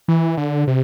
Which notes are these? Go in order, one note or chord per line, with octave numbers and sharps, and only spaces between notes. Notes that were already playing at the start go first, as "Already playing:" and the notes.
E3
D3
C3